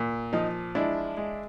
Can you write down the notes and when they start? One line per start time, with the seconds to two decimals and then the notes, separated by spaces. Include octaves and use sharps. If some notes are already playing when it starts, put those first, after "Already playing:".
Already playing: A#2
0.33 F3 D#4
0.75 G#3 D4 E4
1.17 G#3